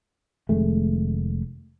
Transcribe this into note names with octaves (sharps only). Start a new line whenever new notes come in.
F1 D#3 G#3 A3